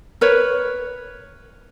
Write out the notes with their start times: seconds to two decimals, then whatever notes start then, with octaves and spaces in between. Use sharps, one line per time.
0.21 A#4 B4 C#5